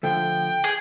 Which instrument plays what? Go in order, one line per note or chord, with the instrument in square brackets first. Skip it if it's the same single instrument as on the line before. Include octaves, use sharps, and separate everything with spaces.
[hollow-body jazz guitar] D3 F3 A3 [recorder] G5
[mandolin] G#4